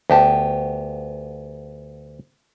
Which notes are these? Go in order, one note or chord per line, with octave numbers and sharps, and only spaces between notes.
D2 B3 G4 A5